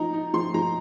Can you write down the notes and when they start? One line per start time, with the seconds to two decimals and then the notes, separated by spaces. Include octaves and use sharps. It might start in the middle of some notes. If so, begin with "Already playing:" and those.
Already playing: F3 D#4 A#5
0.13 D#4
0.34 F3 C6
0.54 F3 A#5